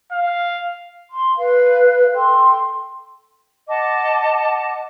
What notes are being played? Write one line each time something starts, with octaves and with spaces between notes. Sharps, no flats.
F5
C6
B4 F5
A4 G5 C6
D#5 F#5 A5 D6